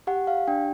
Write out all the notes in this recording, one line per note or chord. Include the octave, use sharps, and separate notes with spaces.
G4 F#5
F5
D4 G5